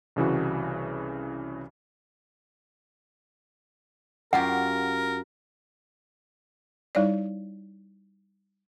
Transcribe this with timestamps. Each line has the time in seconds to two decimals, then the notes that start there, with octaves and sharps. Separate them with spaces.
0.16 C2 C#3 E3 F#4
4.33 F#2 F4 G4 A#4 F#5
6.95 G3 D#4 E4 C#5 D5